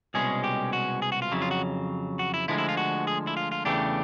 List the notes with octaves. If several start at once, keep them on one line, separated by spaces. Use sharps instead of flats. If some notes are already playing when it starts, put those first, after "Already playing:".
C2 B2 G#3 C#4 G#4
G4
F#4
G#4
F#4
F4
F2 C#3 F#3 E4
F4
F#4
F#4
E4
D2 D3 F3 G#3 E4
E4
F4
F#4
G#4
E4
F4
F4
E2 C#3 E3 A3 D4 G4